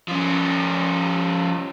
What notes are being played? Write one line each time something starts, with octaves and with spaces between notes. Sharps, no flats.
F3 C#4